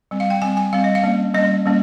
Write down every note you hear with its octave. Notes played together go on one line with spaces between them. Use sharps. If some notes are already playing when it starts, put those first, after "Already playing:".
G3 C4
F5
G5
G3 C4 G#5
G#5
G3 C4 F5
D#5
F5
G3 A#3 C#4
G3 A#3 C#4 D#5
G3 A#3 C#4